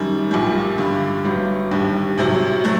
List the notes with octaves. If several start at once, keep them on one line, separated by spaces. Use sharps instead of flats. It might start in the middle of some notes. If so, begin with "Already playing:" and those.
Already playing: F#2 D#3 G3
A#1 A#2 G3
G2 D3 G3
G1 G2 F#3
D#2 D3 G3
C2 C3 F#3
F#3 A3